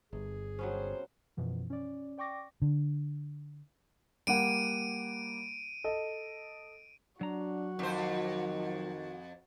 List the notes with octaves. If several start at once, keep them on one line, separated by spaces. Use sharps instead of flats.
G1 G2 G#4
C3 F#3 G3 B3 C#4 C5
F#2 B2 E3 F3
C#4 D5
D5 G5 C#6 D6 A#6
D3
G3 A#3 F#5 D7 D#7
A4 D#5
F#3 D4 F#4 A#5
F2 D#3 C5